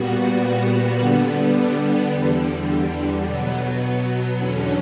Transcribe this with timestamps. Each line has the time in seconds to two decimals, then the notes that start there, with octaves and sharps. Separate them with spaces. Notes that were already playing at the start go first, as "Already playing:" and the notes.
Already playing: A#2 G3 B3 F#4
0.98 D3 G3 B3
2.12 E2 D3 G3
3.24 B2 F#3 B3
4.37 E2 D3 F#3 C#4